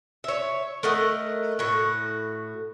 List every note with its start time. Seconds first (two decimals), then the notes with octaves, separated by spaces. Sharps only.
0.24 C#5 E5
0.83 A3 A#4 D#5 F#5
1.59 A2 F#4